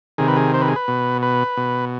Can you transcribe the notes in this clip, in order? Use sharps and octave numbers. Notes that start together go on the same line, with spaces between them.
C3 D#3 G#4
B4
G#4
C5
B4
G#4
B4
B2
B4
B2